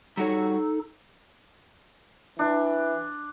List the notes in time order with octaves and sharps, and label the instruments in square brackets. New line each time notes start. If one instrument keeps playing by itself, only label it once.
[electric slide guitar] G3 F#4 C#5 [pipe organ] D#4 A4
[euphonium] E3 [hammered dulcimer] D4